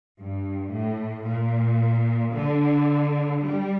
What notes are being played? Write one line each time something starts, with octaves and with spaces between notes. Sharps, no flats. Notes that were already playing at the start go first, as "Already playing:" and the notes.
G2
A2
A#2
D3
G3